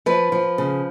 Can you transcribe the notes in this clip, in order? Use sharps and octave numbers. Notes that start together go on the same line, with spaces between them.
F3 B4
F3
C#3